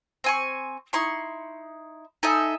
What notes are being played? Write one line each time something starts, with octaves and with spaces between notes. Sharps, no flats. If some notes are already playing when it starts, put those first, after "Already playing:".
C4 G#5 C#6
D#4 E4 C6 C#6
D#4 A4 E5 G#5